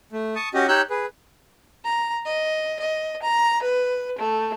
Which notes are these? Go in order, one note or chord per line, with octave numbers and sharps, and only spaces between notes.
A3
A5 C#6 D#6
C#4 F#4 G4 D#5
D#4 G4 C#5 E6 F#6 G6
G#4 B4
A#5
D#5
D#5
A#5
B4
A3